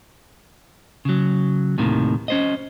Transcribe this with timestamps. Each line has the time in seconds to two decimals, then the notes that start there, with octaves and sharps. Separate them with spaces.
1.05 C#3 F#3
1.78 D#2 A2 C3 D#3
2.28 C#4 C5 D#5